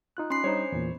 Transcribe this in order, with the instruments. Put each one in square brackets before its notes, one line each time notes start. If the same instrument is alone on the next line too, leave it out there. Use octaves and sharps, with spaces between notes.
[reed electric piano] D#4 F4 F#6
[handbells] C#4 B5 C7 [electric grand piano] C6
[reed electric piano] G3 D4 D#4 [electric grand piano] C5 C#5
[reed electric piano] E2 A#2